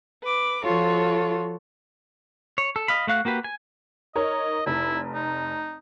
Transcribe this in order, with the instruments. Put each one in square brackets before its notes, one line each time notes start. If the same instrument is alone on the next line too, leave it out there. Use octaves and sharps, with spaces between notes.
[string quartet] B4 D6
F3 F4 F#4 A4 C#5
[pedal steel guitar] C#5
A4
D#5 F5 B5
A3 F#4 F5 F#6
A#3 F#4 G4 B4
G#5
[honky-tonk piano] D#4 A#4 C#5 [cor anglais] D#5
[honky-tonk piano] F1 [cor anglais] E4
[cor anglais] D#4